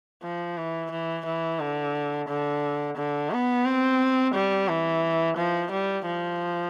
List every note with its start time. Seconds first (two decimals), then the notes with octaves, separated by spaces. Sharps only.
0.23 F3
0.57 E3
0.91 E3
1.26 E3
1.60 D3
2.28 D3
2.97 D3
3.31 B3
3.65 C4
4.34 G3
4.68 E3
5.37 F3
5.71 G3
6.06 F3